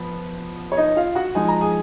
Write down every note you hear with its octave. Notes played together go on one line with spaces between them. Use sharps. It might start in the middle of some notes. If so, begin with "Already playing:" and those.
Already playing: F3 B3
C#5
D#4 D#5
F4 F5
F#4 F#5
F3 G#3 D#4 G#5
A#5
G#4 G#5